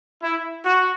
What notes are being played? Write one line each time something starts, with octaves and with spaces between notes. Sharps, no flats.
E4
F#4